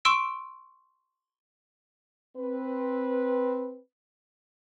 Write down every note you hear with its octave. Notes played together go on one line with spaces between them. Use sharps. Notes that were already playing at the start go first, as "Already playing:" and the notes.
C6 C#6 E6 D7 E7
C4 B4